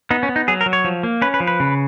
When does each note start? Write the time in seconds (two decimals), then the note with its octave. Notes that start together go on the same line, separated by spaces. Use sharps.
0.11 B3 D#4
0.23 C#4
0.29 B3
0.36 D#4
0.48 F#3 G#4
0.61 A#4
0.66 F#3
0.73 C#5
0.84 F3
1.03 A#3
1.22 C#4 B4
1.34 B4
1.40 F3
1.47 B4
1.60 C#3